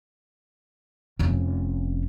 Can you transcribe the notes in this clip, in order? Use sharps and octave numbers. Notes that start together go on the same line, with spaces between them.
F1 C#4